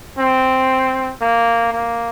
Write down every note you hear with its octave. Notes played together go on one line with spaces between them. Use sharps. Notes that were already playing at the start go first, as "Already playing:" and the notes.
C4
A#3
A#3